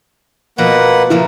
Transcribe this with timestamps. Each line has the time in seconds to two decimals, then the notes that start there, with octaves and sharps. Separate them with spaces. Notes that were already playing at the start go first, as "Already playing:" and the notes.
0.58 B2 F3 A#3 B4 F#5 A#5
1.10 C#3 F3 A#3 E4